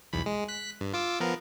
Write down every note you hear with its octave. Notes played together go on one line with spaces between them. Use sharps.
B1 E2 B5
G#3
F#6 B6
G2
F4 D6 E6
F3 B3 A#4